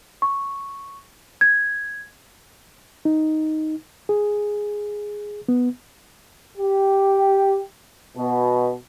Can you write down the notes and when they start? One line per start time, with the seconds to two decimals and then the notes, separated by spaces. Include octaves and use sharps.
0.22 C#6
1.41 G#6
3.05 D#4
4.09 G#4
5.48 B3
6.57 G4
8.17 B2